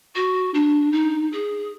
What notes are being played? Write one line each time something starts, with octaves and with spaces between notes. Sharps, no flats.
F#4
D4
D#4
G#4